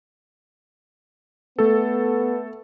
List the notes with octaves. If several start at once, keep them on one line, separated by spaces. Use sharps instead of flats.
A3 B3 A4